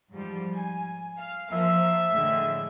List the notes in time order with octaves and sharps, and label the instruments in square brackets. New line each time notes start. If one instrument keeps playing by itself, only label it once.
[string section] G#2 F3 G3
G#5
F5
[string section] F3 A#3 [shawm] E5
[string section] A2 D3 G#3